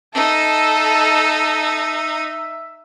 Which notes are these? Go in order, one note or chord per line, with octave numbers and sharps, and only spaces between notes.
D#4 A4 E5 A5